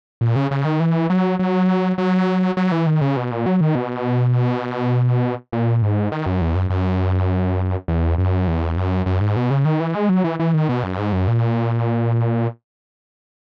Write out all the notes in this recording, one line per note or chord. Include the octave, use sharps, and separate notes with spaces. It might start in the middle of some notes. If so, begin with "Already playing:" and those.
A#2
C#3
C#3
D#3
E3
F#3
F#3
F#3
F#3
E3
D#3
C#3
B2
A#2
F#3
D#3
B2
A#2
G#2
D#3
F#2
E2
F#2
F#2
E2
F#2
E2
F#2
F#2
G#2
B2
C#3
D#3
E3
G#3
F#3
E3
E3
D#3
B2
F#2
G#2
F#2
A#2